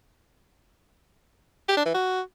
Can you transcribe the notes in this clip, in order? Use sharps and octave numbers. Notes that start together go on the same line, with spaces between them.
G4
D4
E3
F#4